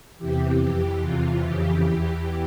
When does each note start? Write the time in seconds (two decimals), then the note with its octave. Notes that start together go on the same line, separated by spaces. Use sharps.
0.18 E2 C3 E3 G4
0.59 F2 E3 G4
1.00 E2 C3 E3 F4
1.41 F2 C#3 E3 G4
1.81 E2 E3 G4